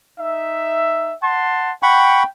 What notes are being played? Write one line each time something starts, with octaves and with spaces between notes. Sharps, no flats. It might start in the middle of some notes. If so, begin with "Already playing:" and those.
D#4 E5
F#5 A5 C6
F#5 G5 B5 C#6